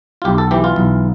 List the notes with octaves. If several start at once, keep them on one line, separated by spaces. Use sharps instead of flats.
F4
B1 G4
A4
E3 G4
F4
B1